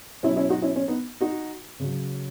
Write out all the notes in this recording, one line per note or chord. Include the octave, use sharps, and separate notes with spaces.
B2 F#3 C#4 E4
C#4 E4
D#4 F#4
C#4 E4
C#4
B3 D#4
D#4 F#4
C#3 F#3